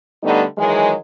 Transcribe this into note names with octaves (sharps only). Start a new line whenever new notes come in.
D3 G3 A3 B3 D#4
D#3 E3 F#3 G#3